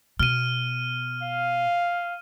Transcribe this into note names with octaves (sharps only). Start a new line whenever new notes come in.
B2 F6 D#7
F5